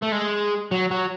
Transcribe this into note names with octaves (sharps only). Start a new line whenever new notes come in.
A3
G#3
F#3
F#3